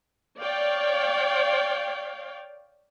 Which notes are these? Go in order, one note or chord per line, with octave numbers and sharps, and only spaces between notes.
C#5 D5 F5 G5